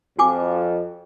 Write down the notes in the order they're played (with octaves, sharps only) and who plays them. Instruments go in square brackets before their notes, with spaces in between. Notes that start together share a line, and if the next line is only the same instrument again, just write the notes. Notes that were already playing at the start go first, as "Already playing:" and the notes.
[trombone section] F2 [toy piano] F#4 G#5 D6